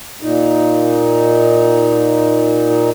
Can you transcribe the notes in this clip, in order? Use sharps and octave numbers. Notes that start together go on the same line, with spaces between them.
A#2 D#4